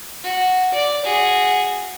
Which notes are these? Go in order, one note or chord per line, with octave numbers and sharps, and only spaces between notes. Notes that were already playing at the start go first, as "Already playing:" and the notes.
F#4
D5
F#4 G#4